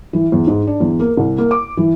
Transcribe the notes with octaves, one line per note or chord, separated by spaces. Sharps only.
E3
E2
G#2
D4
E2
A#3
C2
A#3
D6
E3